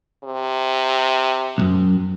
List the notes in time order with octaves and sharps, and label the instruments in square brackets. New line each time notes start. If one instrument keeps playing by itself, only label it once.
[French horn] C3
[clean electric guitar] B1 F#2